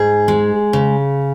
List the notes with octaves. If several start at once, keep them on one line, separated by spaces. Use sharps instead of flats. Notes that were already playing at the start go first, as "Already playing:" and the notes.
Already playing: G#2 G#4
G#3
C#3